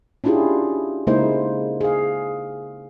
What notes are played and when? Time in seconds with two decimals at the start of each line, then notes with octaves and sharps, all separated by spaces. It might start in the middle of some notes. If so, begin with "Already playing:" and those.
0.24 C#4 D4 E4 F4 G4 G#4
1.07 C#3 G#3 A#3 D#4 E4 C5
1.81 G#4 F5